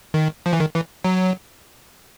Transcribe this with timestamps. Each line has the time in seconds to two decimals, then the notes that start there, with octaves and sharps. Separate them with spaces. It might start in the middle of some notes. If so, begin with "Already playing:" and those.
0.14 D#3
0.46 F3
0.53 E3
0.60 D#3
0.75 E3
1.04 F#3